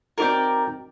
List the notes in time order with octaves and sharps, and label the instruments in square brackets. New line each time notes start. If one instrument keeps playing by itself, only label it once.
[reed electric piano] C4 D#4 F#4 [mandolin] A#4 D5 G5